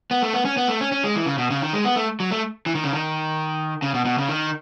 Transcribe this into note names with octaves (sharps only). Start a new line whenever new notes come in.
B3
A3
B3
C#4
B3
A3
C#4
C#4
G#3
E3
C#3
B2
C#3
D#3
G#3
B3
A3
F#3
A3
E3
D#3
C#3
D#3
C#3
B2
B2
C#3
D#3